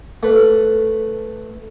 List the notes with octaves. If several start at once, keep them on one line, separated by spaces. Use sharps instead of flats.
A3 B4